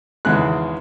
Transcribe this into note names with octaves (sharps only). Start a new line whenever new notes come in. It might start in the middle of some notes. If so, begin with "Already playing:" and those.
G#1 E2 C#3 G#3 F#6